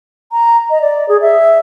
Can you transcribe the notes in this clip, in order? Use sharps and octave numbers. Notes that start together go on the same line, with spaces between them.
A#5
D#5
D5
G#4
E5